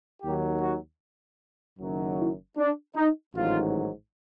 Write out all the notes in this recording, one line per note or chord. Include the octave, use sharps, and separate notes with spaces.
D#2 D#3 F#3 G4
F#4
F#1 F#2 D#3 F#3
E4
D4
D#4
A1 G#2 D#3 F#3 F4